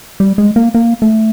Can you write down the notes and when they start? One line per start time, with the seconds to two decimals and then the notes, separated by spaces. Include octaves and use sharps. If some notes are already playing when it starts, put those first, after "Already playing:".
0.20 G3
0.38 G#3
0.56 A#3
0.75 A#3
1.02 A3